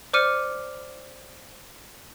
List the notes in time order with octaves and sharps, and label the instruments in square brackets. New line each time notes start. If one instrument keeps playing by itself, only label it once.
[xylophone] C5 D5 D6 F6 C#7 D#7